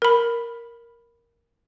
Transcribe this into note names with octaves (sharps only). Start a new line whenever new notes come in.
A#4 B5